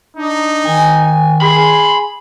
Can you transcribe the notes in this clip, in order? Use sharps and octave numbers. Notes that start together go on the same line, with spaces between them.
D4 D#4
D#3 G#5
G#5
G#4 B5 C6